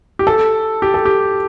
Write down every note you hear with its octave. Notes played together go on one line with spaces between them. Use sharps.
G4
A4
G4
A4
G4